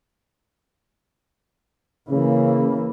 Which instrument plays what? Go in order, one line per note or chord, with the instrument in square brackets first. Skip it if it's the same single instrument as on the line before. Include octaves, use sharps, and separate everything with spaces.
[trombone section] C#3 [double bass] E3 A#3